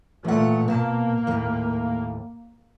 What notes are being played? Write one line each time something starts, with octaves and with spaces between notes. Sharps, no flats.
A#2 E3 A3 F#5
B2 A#3 A5
D#2 A2